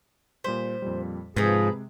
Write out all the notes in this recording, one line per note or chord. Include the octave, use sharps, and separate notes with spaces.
A#2 G3 C5 B6
F2 A#2 G3
G#2 C3 F3 G#3 G#4 B4 A#5